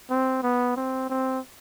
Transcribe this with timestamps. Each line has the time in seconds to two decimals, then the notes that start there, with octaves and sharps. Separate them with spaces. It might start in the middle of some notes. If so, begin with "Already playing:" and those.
0.10 C4
0.43 B3
0.76 C4
1.10 C4